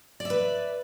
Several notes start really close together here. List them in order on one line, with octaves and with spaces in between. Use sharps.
D5 E5 B4